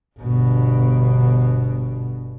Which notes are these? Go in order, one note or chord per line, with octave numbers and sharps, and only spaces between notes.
G1 B2